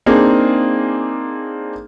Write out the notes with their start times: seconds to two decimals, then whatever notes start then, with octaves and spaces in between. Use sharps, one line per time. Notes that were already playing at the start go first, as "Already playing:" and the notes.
0.06 A#3 C4 D4 D#4 G#4